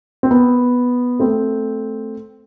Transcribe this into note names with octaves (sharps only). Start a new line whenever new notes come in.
C4
B3
A3 C4